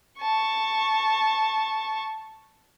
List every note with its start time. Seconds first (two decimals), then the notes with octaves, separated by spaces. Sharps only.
0.21 A5 C#6